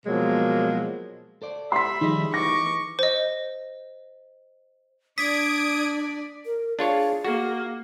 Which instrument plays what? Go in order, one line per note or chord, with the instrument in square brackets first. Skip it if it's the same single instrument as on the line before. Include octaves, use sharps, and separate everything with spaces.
[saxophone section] B2 F3 F#3 G#3 A#3
[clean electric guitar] A4 C5 D5
[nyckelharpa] E5 B5 [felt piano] C6 B6
[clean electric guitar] D#3 F3 G3 [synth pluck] D#4 G#4 D#5
[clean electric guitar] E3 [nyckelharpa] C#6 D6 [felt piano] A#6
[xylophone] C5 D#5
[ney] D4 [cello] D5 [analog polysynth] D#6 G#6 D7 [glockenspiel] B6
[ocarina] A#4
[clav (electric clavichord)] D4 F4 C#5 [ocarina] G#4
[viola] A#3 [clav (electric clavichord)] F#4